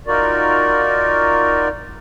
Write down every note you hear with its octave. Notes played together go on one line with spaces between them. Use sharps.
D#4 F4 F#4 A#4 D5